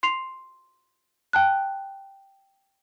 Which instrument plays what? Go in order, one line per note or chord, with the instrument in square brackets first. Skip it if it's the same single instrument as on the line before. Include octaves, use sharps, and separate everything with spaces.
[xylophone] C6 C7 F7
G5 A5 F#6